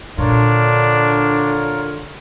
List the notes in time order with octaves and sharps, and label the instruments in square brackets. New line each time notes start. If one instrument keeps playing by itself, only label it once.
[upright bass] A#2 [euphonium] D3 [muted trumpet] D4 [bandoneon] F4 A#4 C#5